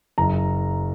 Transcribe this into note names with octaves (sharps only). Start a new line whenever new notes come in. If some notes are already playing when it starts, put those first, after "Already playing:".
F#1 A#5